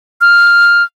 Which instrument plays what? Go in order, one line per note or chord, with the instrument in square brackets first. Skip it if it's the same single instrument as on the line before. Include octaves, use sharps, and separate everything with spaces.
[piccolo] F6